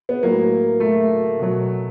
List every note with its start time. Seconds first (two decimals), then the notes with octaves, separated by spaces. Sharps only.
0.09 B3
0.23 A2 F#3 A#3
0.80 A3
1.39 B2 F#3